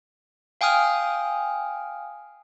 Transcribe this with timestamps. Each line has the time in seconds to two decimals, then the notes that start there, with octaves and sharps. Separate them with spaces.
0.61 F5 G5 G#5 D#6 F6